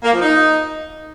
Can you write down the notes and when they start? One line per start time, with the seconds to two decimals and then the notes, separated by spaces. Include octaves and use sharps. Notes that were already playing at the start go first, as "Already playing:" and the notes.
0.04 A#3
0.13 F3
0.22 D#4